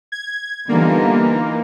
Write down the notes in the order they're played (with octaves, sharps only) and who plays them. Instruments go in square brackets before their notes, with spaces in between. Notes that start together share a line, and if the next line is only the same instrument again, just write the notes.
[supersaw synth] G#6
[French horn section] D3 G3 B3 [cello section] E3 D#4 F4 [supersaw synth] A#3